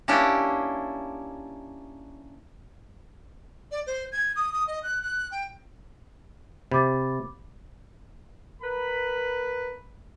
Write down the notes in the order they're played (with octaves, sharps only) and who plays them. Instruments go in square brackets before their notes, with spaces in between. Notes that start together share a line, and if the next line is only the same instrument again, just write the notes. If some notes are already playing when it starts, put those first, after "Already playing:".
[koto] A#3 C#4 D4 E4 G4
[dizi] D5
C5
G#6
D#6
D#6
D#5
F#6
F#6
G5
[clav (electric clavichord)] C3 [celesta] B5 D6 A6
[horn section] A#4 B4 B5